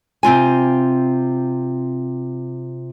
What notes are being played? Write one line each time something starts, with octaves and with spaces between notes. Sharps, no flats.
C3 C4 F4 G#5